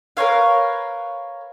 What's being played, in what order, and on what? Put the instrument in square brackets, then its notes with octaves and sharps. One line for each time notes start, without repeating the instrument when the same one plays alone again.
[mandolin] A#4 B4 C#5 F5